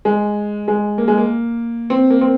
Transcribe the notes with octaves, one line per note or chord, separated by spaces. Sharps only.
G#3
G#3
A#3
G#3
A#3
C4
A#3
C4